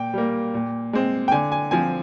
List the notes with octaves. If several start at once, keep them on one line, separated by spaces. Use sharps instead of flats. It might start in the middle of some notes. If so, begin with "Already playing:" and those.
Already playing: A#2 G5
G3 A#3
A#2
G#3 C4
G5
D3 G#5
G#5
F3 C4 G#5